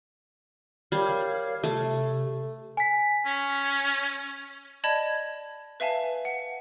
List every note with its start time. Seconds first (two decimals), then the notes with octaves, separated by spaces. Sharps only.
0.92 G3 A#4 C#5 F5
1.64 C3 A3
2.77 G#5 B6
3.25 C#4
4.84 D5 D#5 A5 B5 G#6
5.80 B4 E5 F5 G#5 A5
6.25 F#5